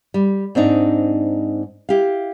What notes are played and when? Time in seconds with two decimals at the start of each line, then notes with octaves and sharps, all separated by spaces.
0.14 G3
0.55 G#2 C4 D4 D#4
1.89 E4 G4 F5